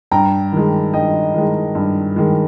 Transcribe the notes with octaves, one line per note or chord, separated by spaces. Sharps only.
G2 G5 A#5
D#3 G#3
G2 D#5 G5
D#3 G#3
G2
D#3 G#3